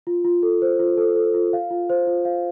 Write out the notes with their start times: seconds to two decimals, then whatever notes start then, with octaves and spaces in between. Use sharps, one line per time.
0.07 F4
0.24 F4
0.43 A4
0.62 C5
0.80 F4
0.97 A4
1.16 A4
1.34 F4
1.53 F5
1.71 F4
1.90 C5
2.07 F4
2.25 F5